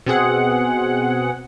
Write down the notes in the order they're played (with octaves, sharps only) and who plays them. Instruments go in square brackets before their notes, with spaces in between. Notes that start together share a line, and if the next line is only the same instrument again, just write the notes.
[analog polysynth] B2 C4 G#4 F#5